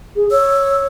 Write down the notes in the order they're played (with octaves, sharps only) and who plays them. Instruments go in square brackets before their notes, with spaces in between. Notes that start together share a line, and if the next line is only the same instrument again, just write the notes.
[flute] G#4
[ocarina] C#5 [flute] E6